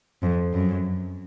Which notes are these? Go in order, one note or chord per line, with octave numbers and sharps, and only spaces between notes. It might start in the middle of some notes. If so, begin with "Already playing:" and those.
F2
F#2